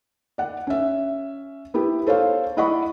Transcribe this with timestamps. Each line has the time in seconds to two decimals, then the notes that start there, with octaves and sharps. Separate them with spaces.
0.38 D5 F#5
0.67 C#4 E5
1.74 B3 E4 G4
2.07 A4 C5 C#5 F5
2.57 E4 D5 D#5 F#5 B5 C#6